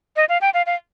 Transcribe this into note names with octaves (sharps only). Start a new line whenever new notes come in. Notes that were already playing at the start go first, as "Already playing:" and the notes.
D#5
F5
G5
F5
F5